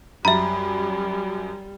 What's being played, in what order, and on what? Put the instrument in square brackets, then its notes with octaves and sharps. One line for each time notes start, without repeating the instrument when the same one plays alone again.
[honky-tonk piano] F#2 [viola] G3 [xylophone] E5 A#5 [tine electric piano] B5